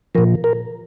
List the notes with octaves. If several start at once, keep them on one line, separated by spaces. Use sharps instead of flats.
A#2 F3 A#4
A#4